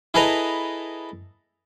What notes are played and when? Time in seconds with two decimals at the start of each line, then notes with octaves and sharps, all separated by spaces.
0.14 E4 G#4 A4 B4 D#5 A#5